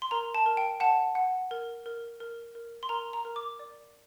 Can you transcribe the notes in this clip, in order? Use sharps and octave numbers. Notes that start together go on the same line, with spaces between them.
C6
A#4 A#5
A5
A#4
G5
F#5 A5
F#5
A#4
A#4
A#4
A#4
C6
A#4 A#5
A#5
A#4
D6
D5